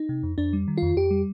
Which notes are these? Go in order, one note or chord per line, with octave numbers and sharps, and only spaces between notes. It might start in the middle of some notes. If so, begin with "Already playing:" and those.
Already playing: D#4
C3
F2
F2 D4
G3
D#3
F2 F4
F2 G4
G3